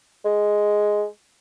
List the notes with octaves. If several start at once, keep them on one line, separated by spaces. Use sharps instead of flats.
G#3